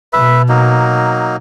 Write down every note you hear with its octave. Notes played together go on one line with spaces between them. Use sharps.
B2 B4 E5
F#3 A#3 D#4